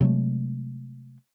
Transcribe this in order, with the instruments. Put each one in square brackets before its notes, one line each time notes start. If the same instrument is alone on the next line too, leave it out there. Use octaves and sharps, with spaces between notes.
[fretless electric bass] C3 F#3 G#3 A3